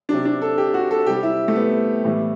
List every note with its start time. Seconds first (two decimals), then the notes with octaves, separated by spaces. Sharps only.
0.09 C3 F#3 D4
0.25 D4
0.42 A4
0.58 G4
0.74 F#4
0.91 A4
1.06 C3 G3 G4
1.23 E4
1.48 A3
1.56 B3
2.05 A2 E3 G3